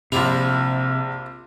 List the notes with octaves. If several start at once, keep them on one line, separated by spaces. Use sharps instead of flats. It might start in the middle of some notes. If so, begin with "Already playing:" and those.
A#1 C3 F3 G3 E4 F7